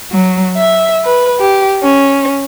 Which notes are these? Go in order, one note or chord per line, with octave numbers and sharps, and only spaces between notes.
F#3
E5
B4
G4
C#4